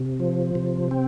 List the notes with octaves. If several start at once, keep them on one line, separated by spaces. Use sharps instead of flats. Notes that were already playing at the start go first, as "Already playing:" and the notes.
Already playing: C3
F3
C3
C4